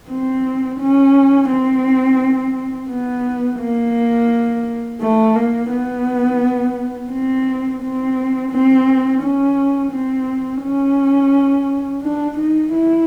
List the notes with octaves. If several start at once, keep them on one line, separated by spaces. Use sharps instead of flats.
C4
C#4
C4
B3
A#3
A3
A#3
B3
C4
C4
C4
C#4
C4
C#4
D4
D#4
E4